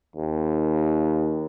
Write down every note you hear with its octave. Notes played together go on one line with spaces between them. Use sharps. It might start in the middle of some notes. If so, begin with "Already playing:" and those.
D#2